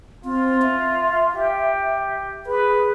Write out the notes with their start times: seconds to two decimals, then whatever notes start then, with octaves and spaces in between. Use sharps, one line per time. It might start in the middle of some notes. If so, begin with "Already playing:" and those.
0.25 C4 F4
0.62 E5
1.35 G4
2.47 G#4 B4